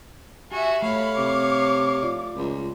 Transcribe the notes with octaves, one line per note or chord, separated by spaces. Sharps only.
F#4 G4 E5 G#5
A3 C#5 F5 B5
C3 D6
F4 D5
C#2